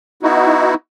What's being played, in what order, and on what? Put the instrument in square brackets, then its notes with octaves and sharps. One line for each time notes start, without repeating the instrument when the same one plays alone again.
[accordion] B3 D#4 E4 F#4